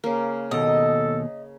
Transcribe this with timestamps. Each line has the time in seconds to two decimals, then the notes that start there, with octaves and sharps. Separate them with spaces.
0.04 C#3 A#3
0.51 D#2 G#2 B2 A4 D#5